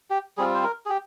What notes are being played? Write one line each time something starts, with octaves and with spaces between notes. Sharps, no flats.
G4
G3 C4 F4 G#4
C5
A#4
G#4
G4